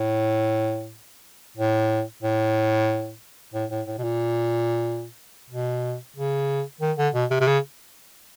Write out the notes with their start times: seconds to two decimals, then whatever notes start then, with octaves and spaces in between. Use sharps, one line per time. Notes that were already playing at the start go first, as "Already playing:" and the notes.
Already playing: A2
1.57 A2
2.23 A2
3.54 A2
3.70 A2
3.87 A2
3.98 B2
4.04 A#2
5.50 B2
6.16 C#3
6.81 D#3
6.98 D3
7.14 B2
7.30 C3
7.40 C3
7.47 C#3